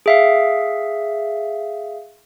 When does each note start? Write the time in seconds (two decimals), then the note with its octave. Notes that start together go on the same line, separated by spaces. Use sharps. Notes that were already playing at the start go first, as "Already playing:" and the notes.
0.06 G#4 E5 F5